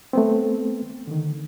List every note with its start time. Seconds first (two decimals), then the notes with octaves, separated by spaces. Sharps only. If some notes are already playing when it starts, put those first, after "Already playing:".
0.13 A3 B3 C4
1.07 D3 D#3